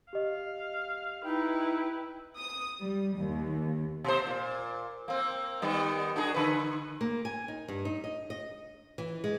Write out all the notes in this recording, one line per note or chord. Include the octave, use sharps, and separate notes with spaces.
G4 D#5 F5
D#4 E4 B4 G5
D#6
G3
D#2
B2 C5
A#2
A#3 C4
D#3 G3 B3
D4 F#4 G#4
D3 B4
A#3
G#5
D#4
G2
D#4
D#5
D#5
E3
G#3